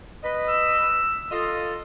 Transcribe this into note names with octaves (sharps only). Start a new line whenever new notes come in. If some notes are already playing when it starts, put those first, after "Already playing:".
B4 D#5
E6
F4 A4 D#5